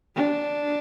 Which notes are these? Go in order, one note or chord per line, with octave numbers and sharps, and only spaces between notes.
D4